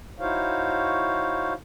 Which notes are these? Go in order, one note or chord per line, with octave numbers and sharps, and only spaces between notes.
D#4 E4 F#4 C5 C#5 F5